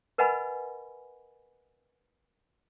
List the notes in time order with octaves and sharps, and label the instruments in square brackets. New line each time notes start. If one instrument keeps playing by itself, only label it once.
[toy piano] A#4 B4 D#5 F#5 G#5 B5